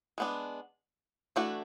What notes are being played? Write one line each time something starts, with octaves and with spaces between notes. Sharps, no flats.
G#3 B3 D4
E3 A3 D4 F#4